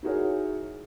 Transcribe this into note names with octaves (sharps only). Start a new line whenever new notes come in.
D#4 E4 F#4 G#4 A#4 C#5